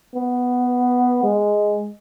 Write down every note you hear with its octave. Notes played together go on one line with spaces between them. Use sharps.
B3
G#3